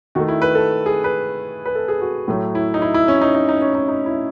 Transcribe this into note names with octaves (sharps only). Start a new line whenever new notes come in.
D#3 A3 F#4
E4
B4
A4
G#4
B4
B4
A4
G#4
F#4
A2 F#3 A3
E4
D#4
E4
E4
C#4
D#4
D#4
D#4
C#4
D#4
D#4
E4